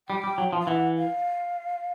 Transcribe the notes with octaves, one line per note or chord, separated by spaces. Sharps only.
G3 G5
G3
F#3
F3
F5
E3 F#5
F5